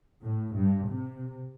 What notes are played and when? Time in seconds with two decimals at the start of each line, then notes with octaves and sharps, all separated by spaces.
0.23 A2
0.56 G2
0.90 C3